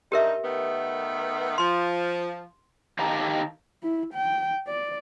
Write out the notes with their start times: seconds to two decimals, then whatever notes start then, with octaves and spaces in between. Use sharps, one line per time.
0.12 G2 G3 D#4 G4 A#4 E5
0.44 D#3 A3 B3
1.58 F3 C6
2.99 D#3 G4 F5 A5 A#5
3.83 E4
4.14 G5
4.68 D5